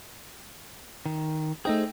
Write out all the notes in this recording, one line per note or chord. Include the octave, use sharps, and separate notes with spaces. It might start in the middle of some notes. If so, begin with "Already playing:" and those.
D#3
A3 D#4 G#4 C5 G5 D#6